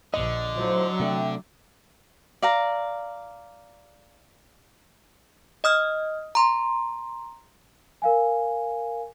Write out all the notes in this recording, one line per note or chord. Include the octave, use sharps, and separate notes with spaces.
A#1 D3 D#5
A2 F#3 F4 C5
C3 A3 D4 D5 E5 G5
D5 F5 A#5
D#5 D#6 F6
A#5 C6
A#4 F5 G#5